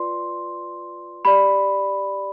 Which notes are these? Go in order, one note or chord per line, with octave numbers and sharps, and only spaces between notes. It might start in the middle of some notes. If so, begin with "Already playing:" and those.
Already playing: F4 B4 D5 C6
G4 D5 B5